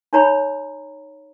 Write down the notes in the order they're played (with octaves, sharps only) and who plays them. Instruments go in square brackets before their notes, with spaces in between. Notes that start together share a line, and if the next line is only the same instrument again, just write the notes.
[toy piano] D#4 C#5 A#5 B5